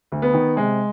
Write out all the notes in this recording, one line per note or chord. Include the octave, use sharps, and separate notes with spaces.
D2
B3
D#3
C3 G#3